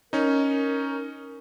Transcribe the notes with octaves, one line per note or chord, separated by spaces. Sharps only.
C#4 D#4 A#4